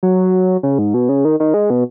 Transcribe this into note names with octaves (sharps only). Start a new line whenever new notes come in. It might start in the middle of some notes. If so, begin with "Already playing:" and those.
F#3
C#3
G#2
B2
C#3
D#3
D#3
G#3
B2